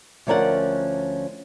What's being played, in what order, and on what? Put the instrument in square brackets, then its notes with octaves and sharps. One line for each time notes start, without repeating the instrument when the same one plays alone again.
[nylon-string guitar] D2 F3 C#4 A#4 D5 F#5